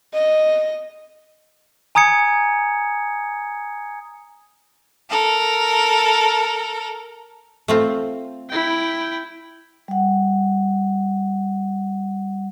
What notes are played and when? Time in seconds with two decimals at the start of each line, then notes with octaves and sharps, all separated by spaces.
0.14 D#5
1.95 G#5 A#5 D#6 G#6 C#7
5.09 A4 A#4
7.68 A3 C4 F4
8.50 E4 G5
9.88 G3 F#5